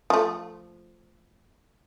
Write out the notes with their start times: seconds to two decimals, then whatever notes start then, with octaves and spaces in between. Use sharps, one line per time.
0.10 F3 A3